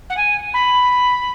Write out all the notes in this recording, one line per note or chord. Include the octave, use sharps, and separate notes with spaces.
F#5
G#5
B5